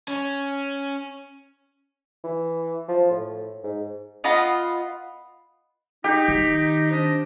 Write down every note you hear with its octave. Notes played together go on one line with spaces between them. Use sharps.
C#4
E3
F3
A2
G#2
B3 F4 D#5 B5
D#4 G4
D#3
C4 D4 D#5